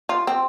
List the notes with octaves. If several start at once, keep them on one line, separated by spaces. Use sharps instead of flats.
F4
C4